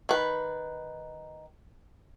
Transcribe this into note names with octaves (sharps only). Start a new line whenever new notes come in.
D#3 B4